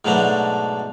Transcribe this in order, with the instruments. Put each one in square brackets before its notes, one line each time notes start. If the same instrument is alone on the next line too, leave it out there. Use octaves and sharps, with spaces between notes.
[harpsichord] G#2 B2 F#3 A3 D4 A#5